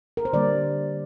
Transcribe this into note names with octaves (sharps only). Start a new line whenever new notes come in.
A#4
C5
D3 G3 A#3 D5